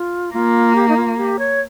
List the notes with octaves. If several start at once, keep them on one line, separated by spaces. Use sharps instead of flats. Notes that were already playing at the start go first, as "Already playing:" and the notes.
Already playing: F4
A#3 F4
G4
D#4
F4
G4
C#5